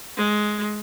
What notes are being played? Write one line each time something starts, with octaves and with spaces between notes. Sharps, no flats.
G#3